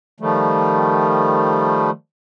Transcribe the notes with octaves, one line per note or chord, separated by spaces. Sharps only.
D#3 F3 G3 A3